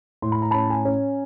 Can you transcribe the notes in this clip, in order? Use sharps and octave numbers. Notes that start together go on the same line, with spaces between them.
A2 C6
B5
A#5
C#4 A5 B5
G#5 A#5
C#4